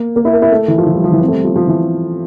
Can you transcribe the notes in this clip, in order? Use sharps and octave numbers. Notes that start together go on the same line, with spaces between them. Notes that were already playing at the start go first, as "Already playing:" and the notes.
Already playing: A#3
A#3
E4
A#4
E4
A3
E3
F3
E3
G3
F3
E3
C4
A3
G3
F3
F3
E3